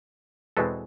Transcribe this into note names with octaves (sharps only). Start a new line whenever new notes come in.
E2 B2 G#3 C4 A4 B4